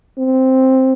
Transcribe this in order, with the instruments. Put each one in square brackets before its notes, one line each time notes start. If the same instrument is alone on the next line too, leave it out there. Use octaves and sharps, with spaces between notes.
[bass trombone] C4